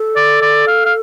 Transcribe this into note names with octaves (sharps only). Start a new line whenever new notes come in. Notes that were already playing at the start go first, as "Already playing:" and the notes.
Already playing: A4
D5
D5
F5
F5